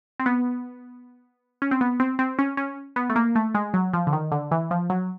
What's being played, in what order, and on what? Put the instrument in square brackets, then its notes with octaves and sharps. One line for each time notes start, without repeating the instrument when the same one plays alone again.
[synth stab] C4
B3
C#4
C4
B3
C4
C4
C#4
C#4
B3
A3
A#3
A3
G#3
F#3
F3
D3
D#3
D3
E3
F3
F#3